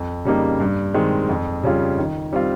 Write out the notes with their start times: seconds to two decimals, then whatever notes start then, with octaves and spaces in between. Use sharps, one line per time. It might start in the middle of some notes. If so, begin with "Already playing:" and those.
Already playing: F2
0.25 C#3 G3 A#3 D#4
0.60 G2
0.94 D#3 G#3 C4
1.29 F2
1.64 C#3 G3 C#4 F4
1.98 D#3
2.33 G3 C4 F4